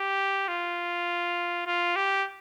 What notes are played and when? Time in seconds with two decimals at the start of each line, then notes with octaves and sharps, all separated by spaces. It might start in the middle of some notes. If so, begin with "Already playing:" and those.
Already playing: G4
0.48 F4
1.67 F4
1.96 G4